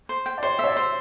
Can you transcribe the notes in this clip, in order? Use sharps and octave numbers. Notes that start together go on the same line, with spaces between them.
C5
G5
D5
C5 C#5
C#5 E5
D5
C5